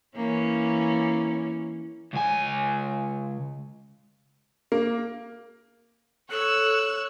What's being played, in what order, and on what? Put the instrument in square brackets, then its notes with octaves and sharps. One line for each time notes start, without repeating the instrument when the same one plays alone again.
[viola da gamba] E3 A#3 C#4
[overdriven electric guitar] C#2 G#5
[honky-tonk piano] A#3
[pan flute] A4 [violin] C#5 E6 [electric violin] F#6